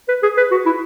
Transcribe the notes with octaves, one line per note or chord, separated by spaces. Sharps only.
B4
G#4
B4
F#4
E4